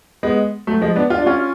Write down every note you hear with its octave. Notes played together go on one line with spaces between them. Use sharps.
G#3 B3
F#3 A3
F3 G#3
B3 D4
F4
D4
C#4 F4